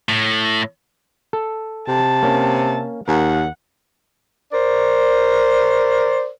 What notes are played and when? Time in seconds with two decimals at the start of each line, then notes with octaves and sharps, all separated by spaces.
0.09 A2
1.33 A4
1.88 C3 A5
2.23 A#3 C#4
3.08 D#2 A#4 F#5
4.53 A#4 C5 D5